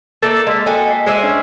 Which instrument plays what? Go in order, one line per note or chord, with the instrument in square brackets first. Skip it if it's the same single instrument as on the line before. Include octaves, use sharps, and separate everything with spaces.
[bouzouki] A#3 E4 D5 [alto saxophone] A4
[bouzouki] G#3 [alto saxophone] A#3 [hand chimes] D#5 B6
[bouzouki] F#4 A4 D#5 [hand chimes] G5 G#5
[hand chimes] B6 C7
[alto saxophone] G#3 [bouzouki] C5 D5 E5
[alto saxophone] C#4 [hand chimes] D4